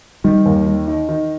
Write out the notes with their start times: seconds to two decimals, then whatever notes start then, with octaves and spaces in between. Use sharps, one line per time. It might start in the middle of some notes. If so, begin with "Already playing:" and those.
0.24 D#3 G3
0.46 D#2
0.66 D#3
0.87 D#4
1.09 D#3